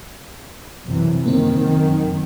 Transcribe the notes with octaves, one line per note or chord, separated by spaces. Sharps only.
F#2 C3 E3
F#2 D#3 A#3 C4